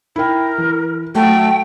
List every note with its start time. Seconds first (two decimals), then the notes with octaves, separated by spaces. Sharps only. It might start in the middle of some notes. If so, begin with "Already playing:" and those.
0.16 E4 A#4 G5
0.58 E3
1.15 F#3 A3 G5